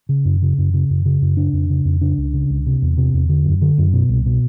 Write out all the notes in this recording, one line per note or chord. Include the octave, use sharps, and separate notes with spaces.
C#3
F#2
C#3
F#2
C#3
F#2
C#3
F#2
C#3 D4
F2
C#3
F2
C#3 D4
C#2
C#3
C#2
C3
E2
C3
E2
D3
F#2
D3
F#2
B2
C2
B2